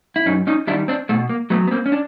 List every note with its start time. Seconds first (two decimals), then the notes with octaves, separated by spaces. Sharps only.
0.16 E4
0.26 F#2 C#4 D#4
0.47 C#4 D#4
0.67 D#3 G3 D4 E4
0.88 C4 D4
1.09 B2 A3
1.29 A#3
1.50 F#3 A3 B3
1.68 B3
1.71 A#3 C4
1.86 C#4
1.92 D4